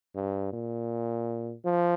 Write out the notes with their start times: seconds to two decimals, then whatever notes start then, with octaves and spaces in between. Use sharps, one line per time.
0.15 G2
0.53 A#2
1.65 F3